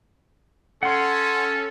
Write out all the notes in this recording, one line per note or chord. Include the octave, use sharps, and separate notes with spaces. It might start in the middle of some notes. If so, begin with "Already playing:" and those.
C#4 A4 F#5 C6